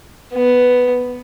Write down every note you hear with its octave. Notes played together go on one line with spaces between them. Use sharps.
B3